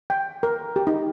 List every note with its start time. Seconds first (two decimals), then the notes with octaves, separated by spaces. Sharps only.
0.10 G5
0.43 A#4
0.76 G4
0.87 D#4